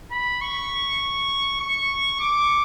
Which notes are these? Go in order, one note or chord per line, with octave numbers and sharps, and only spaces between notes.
B5
C#6
C#6
D6